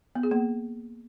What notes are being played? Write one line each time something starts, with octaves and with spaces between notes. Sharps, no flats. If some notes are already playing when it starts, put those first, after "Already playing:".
B3
G#4
A#3